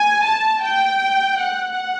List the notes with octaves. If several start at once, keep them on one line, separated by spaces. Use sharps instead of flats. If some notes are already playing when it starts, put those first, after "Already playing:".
Already playing: G#5
A5
G5
F#5